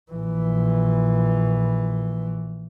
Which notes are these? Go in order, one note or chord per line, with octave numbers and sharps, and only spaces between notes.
A#1 E3